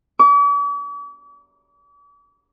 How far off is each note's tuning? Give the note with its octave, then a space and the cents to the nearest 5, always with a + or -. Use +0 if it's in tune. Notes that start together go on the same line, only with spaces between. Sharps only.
D6 -45